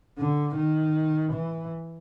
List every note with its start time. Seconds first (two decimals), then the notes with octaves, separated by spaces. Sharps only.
0.18 D3
0.56 D#3
1.33 E3